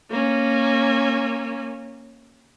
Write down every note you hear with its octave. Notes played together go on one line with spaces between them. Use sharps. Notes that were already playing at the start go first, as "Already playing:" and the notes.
A#3 C#4